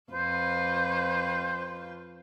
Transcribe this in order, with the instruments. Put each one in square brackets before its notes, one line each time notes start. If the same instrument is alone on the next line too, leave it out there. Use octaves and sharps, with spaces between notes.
[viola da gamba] F2 F4 B4 [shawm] C5